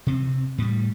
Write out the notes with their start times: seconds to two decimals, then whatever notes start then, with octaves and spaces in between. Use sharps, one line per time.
0.07 C3 C4
0.58 A2 G3